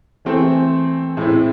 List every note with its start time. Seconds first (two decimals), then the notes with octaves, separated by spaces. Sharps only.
0.25 E3 A3 C4 G#4 C5
1.17 A2 G#3 C4 E4